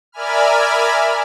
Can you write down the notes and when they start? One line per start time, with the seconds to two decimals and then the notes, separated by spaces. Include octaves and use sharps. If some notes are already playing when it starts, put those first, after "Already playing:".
0.12 A#4 D5 E5 G#5 B5 F6